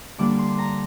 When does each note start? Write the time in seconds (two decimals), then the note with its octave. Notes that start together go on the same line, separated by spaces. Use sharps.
0.18 D3 G3 A#3 D4 D6
0.39 C6
0.58 A#5